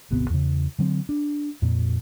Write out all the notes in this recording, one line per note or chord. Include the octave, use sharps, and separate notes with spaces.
D#1 G#1 C3 B3
E2 C#3
D3 F#3 A#3 C4
D4
F2 A#2